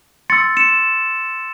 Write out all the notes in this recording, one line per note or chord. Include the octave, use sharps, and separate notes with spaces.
C6 E6 A6 C#7
C#7 E7